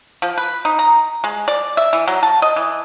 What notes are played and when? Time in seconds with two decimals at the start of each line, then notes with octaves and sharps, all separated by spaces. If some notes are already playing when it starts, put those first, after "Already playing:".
0.22 F3
0.38 B4
0.65 D#4
0.79 A#5
1.24 G#3
1.48 D5
1.77 E5
1.93 E3
2.08 F#3
2.23 A5
2.42 D#5
2.56 E3